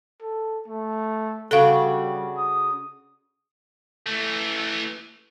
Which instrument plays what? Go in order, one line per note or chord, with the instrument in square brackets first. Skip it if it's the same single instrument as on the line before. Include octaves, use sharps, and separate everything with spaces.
[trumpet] A4
A3
[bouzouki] C#3 D4 F#4 [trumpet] G3 [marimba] A4 F5
[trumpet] D#6
[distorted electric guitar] E3 A3